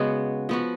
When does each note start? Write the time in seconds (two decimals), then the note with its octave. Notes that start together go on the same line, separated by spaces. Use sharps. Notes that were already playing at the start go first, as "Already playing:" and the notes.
Already playing: C#3 G#3 B3 F#4
0.49 F3 B3 F#4